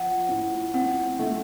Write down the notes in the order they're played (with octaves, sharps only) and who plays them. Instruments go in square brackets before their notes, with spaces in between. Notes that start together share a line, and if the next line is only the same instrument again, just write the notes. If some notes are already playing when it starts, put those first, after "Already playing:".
Already playing: [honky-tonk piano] F3 [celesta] F#5
[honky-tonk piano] A2
[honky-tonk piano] C4 [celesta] F#5
[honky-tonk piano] A3